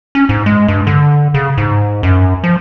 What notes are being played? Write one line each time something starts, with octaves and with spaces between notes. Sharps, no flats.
C#4
G#2
G#3
G2
D3
C#3
G#2
F#2
F3